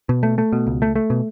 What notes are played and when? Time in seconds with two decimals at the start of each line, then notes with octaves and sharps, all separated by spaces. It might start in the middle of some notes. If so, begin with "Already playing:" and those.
0.09 B2
0.23 A3
0.38 A3
0.53 B2
0.67 C#2
0.82 A3
0.96 A3
1.10 B2